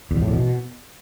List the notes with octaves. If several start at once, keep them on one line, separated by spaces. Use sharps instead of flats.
E2
B2
A2
E2
B2